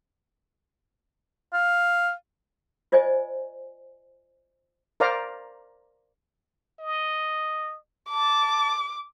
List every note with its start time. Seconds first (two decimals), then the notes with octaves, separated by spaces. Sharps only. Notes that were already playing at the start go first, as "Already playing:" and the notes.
1.53 F5
2.92 F4 C5 D5 D#5 G#5
5.00 A#4 C5 D5 F5 A#5
6.80 D#5
8.10 A5 D6